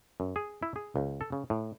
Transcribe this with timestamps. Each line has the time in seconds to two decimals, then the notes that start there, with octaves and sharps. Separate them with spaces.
0.20 F#2
0.36 G#4
0.63 E4
0.76 G#4
0.96 C#2
1.21 A4
1.32 C#3
1.50 A2